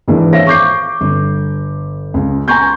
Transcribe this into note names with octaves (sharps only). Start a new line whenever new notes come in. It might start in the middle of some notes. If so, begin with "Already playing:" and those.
G#2 D#3 E3 G#3 D4
C5 C#5 E5 F5 A#6
C#6 D6 G6 C7
G1
C#2
G#5 A#5 C6 C#6 G6